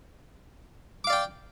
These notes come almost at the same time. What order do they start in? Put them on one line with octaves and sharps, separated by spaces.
D6 F5 D5 G5